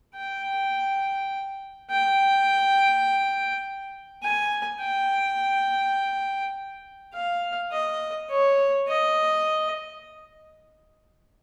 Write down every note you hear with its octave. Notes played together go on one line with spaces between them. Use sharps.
G5
G5
G#5
G5
F5
D#5
C#5
D#5